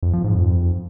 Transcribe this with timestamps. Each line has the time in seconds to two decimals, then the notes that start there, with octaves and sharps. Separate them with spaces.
0.03 F2
0.13 F3
0.24 G#2
0.35 F2